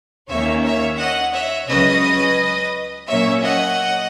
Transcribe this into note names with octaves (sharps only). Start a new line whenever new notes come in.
D#2 D#3 A#3 C#4 C#5 E5
C#5 E5
D#5 F#5
C#5 E5
C#2 C#3 F#3 C#4 B4 D#5
A#2 F#3 A#3 C#4 C#5 E5
D#5 F#5